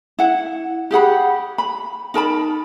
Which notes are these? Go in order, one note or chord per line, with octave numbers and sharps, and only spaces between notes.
E4 F#5
G4 G#4 F#5 B5
B5
D#4 A#4 A5 B5